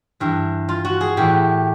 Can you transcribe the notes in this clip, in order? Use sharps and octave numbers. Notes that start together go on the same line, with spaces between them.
G2 E3
F4
F#4
G#4
A2 E3 G4